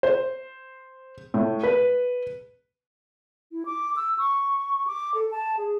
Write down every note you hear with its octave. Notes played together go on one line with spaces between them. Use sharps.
C5
A2
B4
E4
D6
E6
C#6
D6
A4
A5
G#4